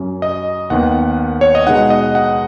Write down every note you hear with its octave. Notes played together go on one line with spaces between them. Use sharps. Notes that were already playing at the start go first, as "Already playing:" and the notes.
Already playing: F#2 F#3 C#4
D#5
D#2 D#3 B3 F#5
C#5
D#5
B2 G#3 D#4 F#5
D#5
F#5